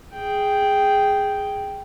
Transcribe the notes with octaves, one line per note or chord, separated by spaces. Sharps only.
G#4 G5